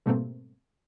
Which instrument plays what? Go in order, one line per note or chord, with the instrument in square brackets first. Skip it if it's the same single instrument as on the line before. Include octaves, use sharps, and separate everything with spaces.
[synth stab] G#2 B2 G3 A3 A#3 C4